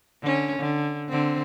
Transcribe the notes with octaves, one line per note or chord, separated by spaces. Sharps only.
D3 C#4
D3
D3 C4